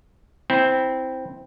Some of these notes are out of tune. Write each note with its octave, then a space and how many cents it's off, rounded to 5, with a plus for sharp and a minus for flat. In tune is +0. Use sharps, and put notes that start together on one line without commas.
C4 +0 E4 -15